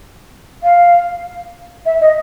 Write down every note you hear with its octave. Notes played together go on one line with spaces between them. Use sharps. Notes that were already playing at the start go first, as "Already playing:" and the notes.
F5
E5
D#5